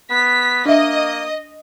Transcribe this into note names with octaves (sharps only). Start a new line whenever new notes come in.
B3 B6
A#3 D4 D#5 E5 D#6